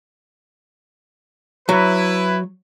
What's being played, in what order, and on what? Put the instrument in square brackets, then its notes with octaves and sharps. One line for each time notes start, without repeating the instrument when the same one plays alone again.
[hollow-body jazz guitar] F#3 [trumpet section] E4 B4